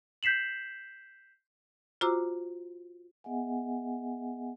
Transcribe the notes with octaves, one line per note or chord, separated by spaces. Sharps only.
G6 B6 C7 E7 F#7
F4 F#4 C5 A#5 D6 E6
B3 G#4 D#5 E5 F#5 G#5